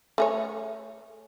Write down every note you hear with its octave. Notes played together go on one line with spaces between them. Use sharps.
A3 G#4 C#5